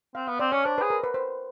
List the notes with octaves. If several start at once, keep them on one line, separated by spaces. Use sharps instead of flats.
C4 F5
B3 F5
C4 D5
C#4 C#5
D4 C5
G#4 B4
A#4
B4
C5